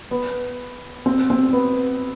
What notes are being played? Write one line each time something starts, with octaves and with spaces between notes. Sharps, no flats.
B3
C4
C4
B3